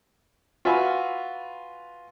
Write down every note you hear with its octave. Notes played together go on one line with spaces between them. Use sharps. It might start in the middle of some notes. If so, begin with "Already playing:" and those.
F4 F#4 B4 E5 G#5 B5